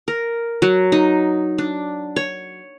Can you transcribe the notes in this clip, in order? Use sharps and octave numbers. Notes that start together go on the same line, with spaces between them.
A#4
F#3
D#4
D4
C#5